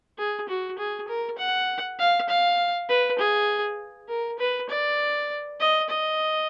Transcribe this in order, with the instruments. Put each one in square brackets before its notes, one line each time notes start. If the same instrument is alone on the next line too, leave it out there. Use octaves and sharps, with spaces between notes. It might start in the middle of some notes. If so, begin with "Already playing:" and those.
[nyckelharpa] G#4
F#4
G#4
A#4
F#5
F5
F5
B4
G#4
A#4
B4
D5
D#5
D#5